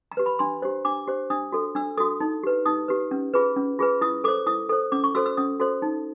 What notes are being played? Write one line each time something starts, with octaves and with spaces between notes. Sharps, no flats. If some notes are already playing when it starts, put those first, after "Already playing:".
A#5
G4 B4
B5
D4 C6
G4 C5
D4 D6
G4 C5
D4 D#6
F#4 A4
D4 E6
F#4 A4 D#6
D#4
G4 B4
D#4 D#6
G4 B4
C#4
F4 G#4 B4
C#4
F4 G#4 B4
E4 D#6
A4 C5 D6
E4 D#6
A4 C5
C#4 D6
C#6
F#4 A4 C5 E6
E6
C#4 D#6
F#4 A4 C5
D#4